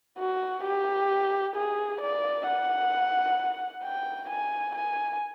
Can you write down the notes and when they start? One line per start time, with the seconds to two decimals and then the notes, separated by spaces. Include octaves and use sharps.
0.19 F#4
0.64 G4
1.56 G#4
2.01 D5
2.46 F#5
3.84 G5
4.30 G#5
4.75 G#5